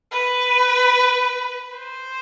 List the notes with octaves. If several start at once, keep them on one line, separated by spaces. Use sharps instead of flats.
B4
C5